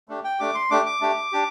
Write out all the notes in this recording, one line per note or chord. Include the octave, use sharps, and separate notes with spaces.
A3 D4 G4
G5
A3 D4 G4 D6
C6
A3 D4 G4 D6
D6
A3 D4 G4
D4 G4